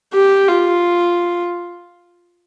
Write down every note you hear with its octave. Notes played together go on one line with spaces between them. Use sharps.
G4
F4